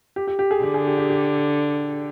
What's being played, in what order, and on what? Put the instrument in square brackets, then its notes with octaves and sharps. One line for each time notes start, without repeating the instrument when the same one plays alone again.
[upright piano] G4
G4
G4
G#4
[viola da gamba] D3 [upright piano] G4
[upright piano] G#4
G4
G4
G4